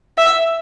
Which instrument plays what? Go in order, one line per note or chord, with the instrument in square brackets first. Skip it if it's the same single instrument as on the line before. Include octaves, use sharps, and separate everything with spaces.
[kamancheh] E5